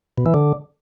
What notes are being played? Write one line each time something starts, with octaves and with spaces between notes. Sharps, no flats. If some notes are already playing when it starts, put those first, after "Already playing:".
B2
E3
D3